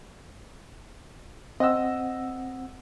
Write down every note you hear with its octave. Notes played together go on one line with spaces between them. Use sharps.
C4 D#5 F#5 E6